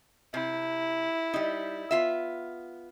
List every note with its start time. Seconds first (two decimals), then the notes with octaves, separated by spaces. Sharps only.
0.34 C3 E4
1.33 G3 D#4
1.91 B3 F4 E5